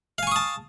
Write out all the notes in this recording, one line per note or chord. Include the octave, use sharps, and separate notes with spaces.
F5 G#5 A5 C#6 D#6